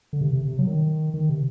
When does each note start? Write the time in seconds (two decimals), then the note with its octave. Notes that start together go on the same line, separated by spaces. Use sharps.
0.13 D3
0.21 C3
0.33 C3
0.45 C3
0.59 F#3
0.67 D#3
1.14 D#3
1.29 C3